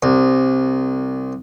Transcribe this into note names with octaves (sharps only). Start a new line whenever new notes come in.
C2